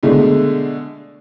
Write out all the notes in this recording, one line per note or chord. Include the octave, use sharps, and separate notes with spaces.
B2 D3 G#3 A3